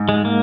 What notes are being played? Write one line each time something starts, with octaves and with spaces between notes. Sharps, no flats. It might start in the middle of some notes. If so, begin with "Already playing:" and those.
Already playing: G#2
G#3
A#3